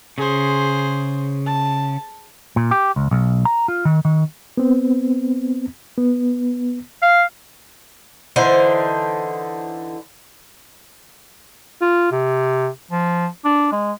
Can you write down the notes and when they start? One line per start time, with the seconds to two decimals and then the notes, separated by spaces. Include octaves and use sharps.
0.18 C#3 G#4 C5
1.46 A5
2.56 A#2
2.71 G4
2.96 C#2
3.11 B1
3.45 A#5
3.68 F4
3.85 D#3
4.05 D#3
4.57 B3 C4
5.98 B3
7.03 F5
8.36 D3 E3 D#4 C5
11.81 F4
12.12 C3
12.91 F3
13.45 D4
13.72 G#3